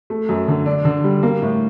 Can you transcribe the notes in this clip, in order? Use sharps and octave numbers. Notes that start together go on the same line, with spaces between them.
A3
F#2
D3
D4
D3
G3
A#3
A2